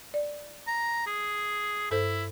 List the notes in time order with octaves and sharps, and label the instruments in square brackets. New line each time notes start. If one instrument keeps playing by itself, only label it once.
[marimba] D5
[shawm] A#5
G#4
[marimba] G2 A4 C5 [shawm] E4